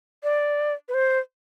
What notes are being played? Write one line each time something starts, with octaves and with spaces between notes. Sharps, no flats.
D5
B4
C5